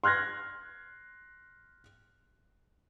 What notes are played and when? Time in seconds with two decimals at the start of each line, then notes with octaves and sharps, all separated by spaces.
0.04 C6 F6 F#6 G#6 A#6